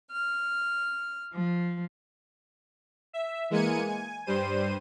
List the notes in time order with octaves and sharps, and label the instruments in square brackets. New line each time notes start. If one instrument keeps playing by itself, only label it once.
[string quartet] F6
F3
[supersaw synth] E5
E3 G#3 A#3 G#5 C#7 D#7
G#5
G2 G3 C5 D#7